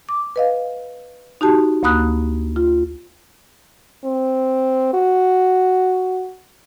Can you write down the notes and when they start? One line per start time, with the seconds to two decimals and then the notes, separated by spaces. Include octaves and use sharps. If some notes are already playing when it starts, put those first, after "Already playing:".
0.09 D6
0.36 B4 D#5 F5
1.41 D#4 F#4 G4 A5
1.83 D2 A#3 B5 D#6 F#6
2.56 F4
4.05 C4
4.94 F#4